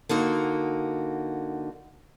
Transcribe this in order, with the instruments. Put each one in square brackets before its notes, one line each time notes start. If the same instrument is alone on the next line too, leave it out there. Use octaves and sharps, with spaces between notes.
[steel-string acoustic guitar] D3 A#3 D#4 F#4